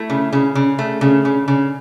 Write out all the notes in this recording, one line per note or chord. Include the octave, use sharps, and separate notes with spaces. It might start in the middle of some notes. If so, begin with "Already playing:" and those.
Already playing: A3 E4
C#3
C#3
C#3
A3
C#3
C#3
C#3